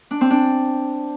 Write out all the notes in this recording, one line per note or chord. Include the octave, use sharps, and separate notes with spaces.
D4
C4
D4